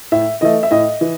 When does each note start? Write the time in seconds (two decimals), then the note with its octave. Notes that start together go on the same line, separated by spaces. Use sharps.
0.12 A2 E5
0.41 E3 A3 D#5
0.63 E5
0.71 A2 D#5
1.01 E3